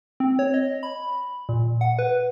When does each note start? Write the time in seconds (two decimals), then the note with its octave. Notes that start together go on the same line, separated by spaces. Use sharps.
0.20 C4
0.39 C#5
0.54 D#5
0.83 B5
1.49 A#2
1.81 F#5
1.99 B4